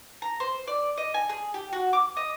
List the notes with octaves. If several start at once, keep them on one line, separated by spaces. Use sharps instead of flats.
A#5
C5
D5
D#5
G#5
G#4
G4
F#4
D6
D#5